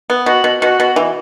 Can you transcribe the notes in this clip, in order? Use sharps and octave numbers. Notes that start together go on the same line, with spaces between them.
B3
B2 F#4
B2
B2 F#4
B2
E3